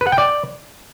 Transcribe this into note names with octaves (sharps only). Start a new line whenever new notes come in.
B4
F#5
G5
D5